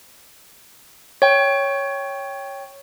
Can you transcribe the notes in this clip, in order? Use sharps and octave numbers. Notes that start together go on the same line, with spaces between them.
C#5 G5